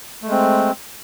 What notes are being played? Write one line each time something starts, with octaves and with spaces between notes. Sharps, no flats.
G#3 A3 C4